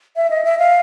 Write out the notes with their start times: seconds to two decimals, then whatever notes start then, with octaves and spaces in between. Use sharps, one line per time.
0.16 E5
0.31 D#5
0.45 E5
0.59 F5